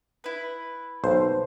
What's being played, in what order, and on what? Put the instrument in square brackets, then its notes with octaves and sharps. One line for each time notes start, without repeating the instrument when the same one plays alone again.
[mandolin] E4 B4
[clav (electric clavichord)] B1 [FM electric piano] C5